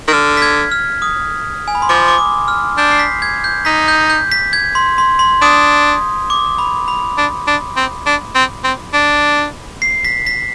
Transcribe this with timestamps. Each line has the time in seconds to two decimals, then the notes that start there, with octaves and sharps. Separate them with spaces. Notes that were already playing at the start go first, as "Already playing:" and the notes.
0.08 D#3
0.13 D3 F6
0.37 B6
0.42 G#6
0.72 F6
1.02 D#6
1.68 G#5
1.75 B5
1.82 C6
1.89 F3 D6
2.08 D6
2.18 D#6
2.48 F6
2.77 D4 G6
2.91 C7
2.99 B6
3.22 G#6
3.44 G6
3.65 D#4 B6
3.88 G6
4.10 G6
4.32 B6
4.53 G#6
4.75 C6
4.98 C6
5.19 C6
5.42 D4 D#6
6.30 D6
6.58 B5
6.88 B5
7.17 D4
7.47 D4
7.76 C4
8.06 D4
8.35 C4
8.64 C4
8.94 D4
9.82 C7
10.05 B6
10.27 B6